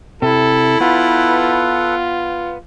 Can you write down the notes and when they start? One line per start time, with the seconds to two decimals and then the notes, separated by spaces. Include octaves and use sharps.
0.22 C3 E4 A4
0.80 B3 F4 A4 B4 F#5